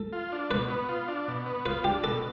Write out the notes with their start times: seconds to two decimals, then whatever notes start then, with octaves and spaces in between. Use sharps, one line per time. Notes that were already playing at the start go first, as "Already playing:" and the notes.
Already playing: A4
0.13 F4
0.32 D4
0.51 B2 B4
0.70 B3
0.89 F4
1.08 D4
1.28 B2
1.46 B3
1.66 F4 B4
1.84 D4 G4
2.04 B2 A4